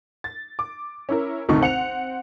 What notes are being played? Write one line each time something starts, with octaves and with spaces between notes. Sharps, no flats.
A6
D6
C#4 E4 A#4
G#1 D2 C3 A3 D#4 C#6
C4 F#5 C#7 F7